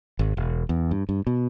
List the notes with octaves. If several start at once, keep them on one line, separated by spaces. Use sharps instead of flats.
G#1
E1
E2
G2
G2
B2